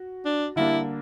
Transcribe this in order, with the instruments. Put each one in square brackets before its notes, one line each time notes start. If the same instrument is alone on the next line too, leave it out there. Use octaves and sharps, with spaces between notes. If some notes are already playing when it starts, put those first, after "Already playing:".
Already playing: [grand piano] F#4
[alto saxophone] D4
[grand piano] D3 G3 A#3 D4 [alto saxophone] E4